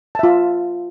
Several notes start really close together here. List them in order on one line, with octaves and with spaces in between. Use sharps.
A5 E5 F4